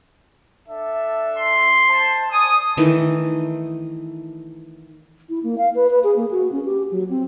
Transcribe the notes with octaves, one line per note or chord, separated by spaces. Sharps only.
D4 A4 E5
C6
C5 A5
D5 G#5 D#6
D#3 E3 A3
E4
A#3
F5
B4
B4
G#4
A#3
F#4
C#4
G4
F#3
C4